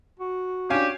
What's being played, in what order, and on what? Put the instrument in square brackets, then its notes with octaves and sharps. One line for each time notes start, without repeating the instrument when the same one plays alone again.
[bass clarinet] F#4
[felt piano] C#4 D4 [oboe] G4 [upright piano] C#5 F5 G#5